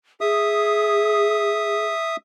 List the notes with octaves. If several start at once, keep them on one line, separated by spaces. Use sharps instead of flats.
G#4 E5 D#6